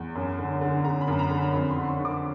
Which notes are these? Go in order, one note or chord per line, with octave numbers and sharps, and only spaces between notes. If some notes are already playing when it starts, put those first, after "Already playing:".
Already playing: E2
F#2
D3
D3
D3 A#5
B5
F#2
A#5
D3
B5
F2 B5
C6
D3
C6
C#6
D3
D6